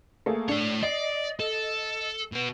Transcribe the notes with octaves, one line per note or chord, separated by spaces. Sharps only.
A3 A#3 G#4
A3 D4 C#5
D5 D#5 C7
A4
B2 B3